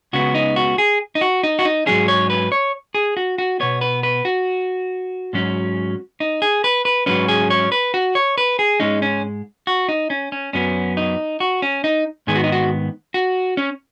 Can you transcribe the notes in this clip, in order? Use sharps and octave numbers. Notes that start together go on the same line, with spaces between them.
C#2 C#3 B3 F#4
D#4
F#4
G#4
D#4
F#4
D#4
F#4
D#4
G#2 F#3 C#4 G#4
C#5
B4
C#5
G#4
F#4
F#4
B2 B3 C#5
B4
B4
F#4
G#2 F#3 C#4
D#4
G#4
B4
B4
G#2 F#3 C#4 B4
G#4
C#5
B4
F#4
C#5
B4
G#4
G#2 G#3 C#4 D#4
C#4
F#4
D#4
C#4
C#4
F#2 F#3 B3 C#4
D#4
F#4
C#4
D#4
G#2 D#3 B3 G#4
F#4
D#4
F#4
F#4
C#4